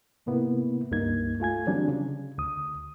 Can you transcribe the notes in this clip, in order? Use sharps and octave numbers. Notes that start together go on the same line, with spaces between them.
G#2 C3 A#3 B3 E4
C#2 G2 A#3 D#4 G#6
A3 F4 G#5 G#6
D3 E3 F#3 G3 C4 D4
C#3
D2 D#6